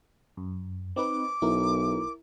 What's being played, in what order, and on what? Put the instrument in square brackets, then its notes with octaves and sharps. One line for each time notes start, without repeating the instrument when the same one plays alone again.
[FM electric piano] F#2
[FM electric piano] C4 D#4 B4 [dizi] D6
[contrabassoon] B1 [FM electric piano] E4 A#4